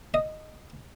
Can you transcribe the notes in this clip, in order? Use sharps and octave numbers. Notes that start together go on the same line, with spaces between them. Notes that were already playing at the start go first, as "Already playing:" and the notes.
D#5